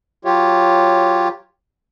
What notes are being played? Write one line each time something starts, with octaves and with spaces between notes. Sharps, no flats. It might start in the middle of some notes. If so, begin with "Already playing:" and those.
F#3 F4 G4 C#5